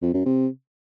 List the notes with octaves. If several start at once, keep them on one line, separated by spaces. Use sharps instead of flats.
F2
F#2
C3